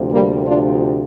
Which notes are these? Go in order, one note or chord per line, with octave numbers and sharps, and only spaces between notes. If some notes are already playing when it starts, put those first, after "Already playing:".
Already playing: D2 C3 F3
G3 A#3
D4 F4